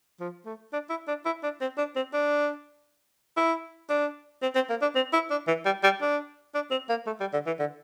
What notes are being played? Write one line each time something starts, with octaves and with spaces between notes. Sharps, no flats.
F3
A3
D4
E4
D4
E4
D4
C4
D4
C4
D4
E4
D4
C4
C4
A#3
D4
C4
E4
D4
E3
G3
G3
D4
D4
C4
A#3
A3
G3
D3
E3
D3